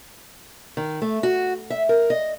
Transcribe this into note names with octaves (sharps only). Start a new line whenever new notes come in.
D#3
A3
F#4
E5
A#4
D#5